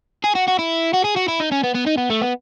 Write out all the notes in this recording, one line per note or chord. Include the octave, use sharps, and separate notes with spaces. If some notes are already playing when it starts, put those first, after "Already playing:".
G#4
F#4
F#4
E4
F#4
G#4
F#4
E4
D#4
C#4
B3
B3
D#4
B3
A3
B3